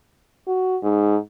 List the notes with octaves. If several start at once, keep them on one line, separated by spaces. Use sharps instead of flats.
F#4
G#2